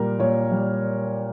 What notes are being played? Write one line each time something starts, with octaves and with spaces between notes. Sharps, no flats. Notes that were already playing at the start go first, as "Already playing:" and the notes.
Already playing: A#2 G3 A#4
A#2 C#5
G3